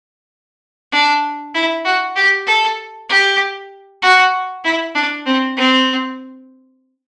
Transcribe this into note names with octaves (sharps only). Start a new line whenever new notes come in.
D4
E4
F#4
G4
A4
G4
F#4
E4
D4
C4
C4